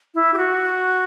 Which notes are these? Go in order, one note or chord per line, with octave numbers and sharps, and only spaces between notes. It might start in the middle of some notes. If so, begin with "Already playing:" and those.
E4
G4
F#4